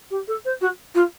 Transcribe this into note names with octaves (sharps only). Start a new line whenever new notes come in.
G4
A4
C5
F#4
F4